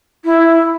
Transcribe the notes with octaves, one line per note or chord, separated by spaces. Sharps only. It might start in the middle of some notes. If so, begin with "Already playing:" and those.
E4